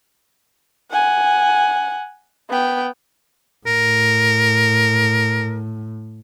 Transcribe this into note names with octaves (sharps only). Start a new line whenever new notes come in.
F#5 G#5
B3 G5
A2 A#4